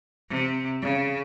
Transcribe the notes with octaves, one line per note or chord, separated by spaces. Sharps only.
C3
C#3